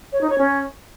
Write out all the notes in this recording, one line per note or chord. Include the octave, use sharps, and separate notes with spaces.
C#5
D#4
C#5
C#4